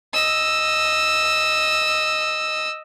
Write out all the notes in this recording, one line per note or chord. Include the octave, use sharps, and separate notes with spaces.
D#5 E6